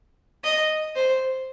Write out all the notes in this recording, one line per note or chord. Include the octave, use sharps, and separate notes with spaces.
D#5
C5